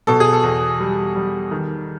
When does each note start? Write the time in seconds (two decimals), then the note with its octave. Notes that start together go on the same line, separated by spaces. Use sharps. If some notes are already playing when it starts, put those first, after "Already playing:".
0.07 B2 A4
0.20 G#4
0.33 A4
0.43 E2
0.80 G3
1.16 G3
1.51 D#3